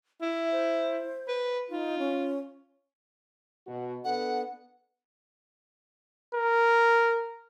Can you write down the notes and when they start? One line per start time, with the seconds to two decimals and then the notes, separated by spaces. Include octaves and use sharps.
0.21 E4 E5
0.52 C5
1.28 B4
1.70 D#4 F4
1.99 C#4
3.67 B2 F#4
4.05 B3 D4 A4 F#5
6.35 A#4